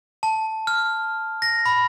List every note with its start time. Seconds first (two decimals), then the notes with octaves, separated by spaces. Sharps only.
0.23 A5
0.67 F6
1.42 A#6
1.66 B5